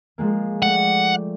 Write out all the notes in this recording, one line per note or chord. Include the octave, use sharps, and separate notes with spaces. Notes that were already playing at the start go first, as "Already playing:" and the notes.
F3 G#3 A#3
A3 D5 F#5 G5